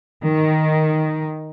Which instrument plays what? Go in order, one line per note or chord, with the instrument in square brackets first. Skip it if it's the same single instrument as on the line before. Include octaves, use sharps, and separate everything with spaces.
[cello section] D#3